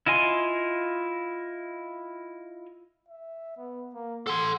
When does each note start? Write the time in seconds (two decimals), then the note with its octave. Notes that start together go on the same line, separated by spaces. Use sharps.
0.06 E4 F4 D#5 G#5 C6
3.09 E5
3.57 B3
3.94 A#3
4.27 A4 F#5 C6